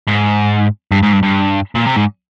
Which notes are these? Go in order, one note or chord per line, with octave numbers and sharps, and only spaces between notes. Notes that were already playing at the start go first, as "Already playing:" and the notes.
G#2
G2
G#2
G2
G2
A#2
C3
G#2